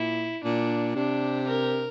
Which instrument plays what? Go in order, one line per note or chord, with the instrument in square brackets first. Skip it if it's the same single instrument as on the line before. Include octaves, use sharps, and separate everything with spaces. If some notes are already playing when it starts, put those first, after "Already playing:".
Already playing: [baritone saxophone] A#2 [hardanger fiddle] E4
[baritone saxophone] A#2 [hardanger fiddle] D4
[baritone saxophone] C3 [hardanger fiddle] D4
[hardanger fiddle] A#4